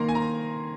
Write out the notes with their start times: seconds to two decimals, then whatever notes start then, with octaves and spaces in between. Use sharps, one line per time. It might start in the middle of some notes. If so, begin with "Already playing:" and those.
Already playing: D#3 A#3 A#5 C6
0.08 G#5
0.15 A#5